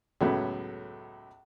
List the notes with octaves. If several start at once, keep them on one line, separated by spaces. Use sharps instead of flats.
C#2 F#2 A2 F#3 A3 B3